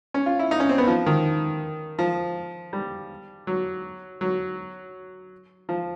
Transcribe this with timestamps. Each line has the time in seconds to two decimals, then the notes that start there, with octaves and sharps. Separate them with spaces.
0.14 C#4
0.26 F4
0.39 E4
0.51 D#4
0.60 C#4
0.69 C4
0.78 B3
0.88 F3
1.06 D#3
1.99 F3
2.73 G3
3.47 F#3
4.21 F#3
5.69 F3